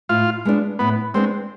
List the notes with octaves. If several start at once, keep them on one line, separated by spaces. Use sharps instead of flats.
A2 F4
G#3 B3 D4
A2 B3
G#3 B3 C4 D4